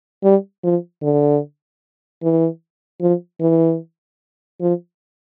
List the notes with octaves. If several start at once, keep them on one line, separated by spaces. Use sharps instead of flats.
G3
F3
D3
E3
F3
E3
F3